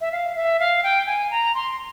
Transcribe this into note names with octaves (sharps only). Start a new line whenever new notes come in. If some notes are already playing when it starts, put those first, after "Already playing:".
E5
F5
E5
F5
G5
G#5
A#5
C6